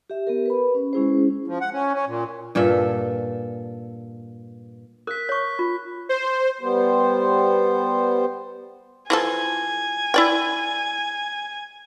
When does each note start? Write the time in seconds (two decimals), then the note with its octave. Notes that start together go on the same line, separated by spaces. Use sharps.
0.10 G4 E5
0.27 B3 G4 A#4
0.46 B4 B5
0.74 C#4
0.93 G#3 C#4 E4 G#4 C5
1.48 F3
1.61 F#5
1.73 C#4
1.94 C#4
2.07 A#2
2.55 G2 A#2 A4 E5
5.07 A#4 F#6 B6
5.29 C#5 C#6
5.59 F4
6.09 C5
6.61 G3 B3 C5
9.10 E3 F3 A4 G#5
10.14 E4 D5 G5